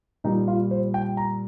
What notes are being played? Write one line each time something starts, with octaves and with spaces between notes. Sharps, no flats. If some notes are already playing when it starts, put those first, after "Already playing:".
A#2 G3 D#4
F4
C5
G5
A#5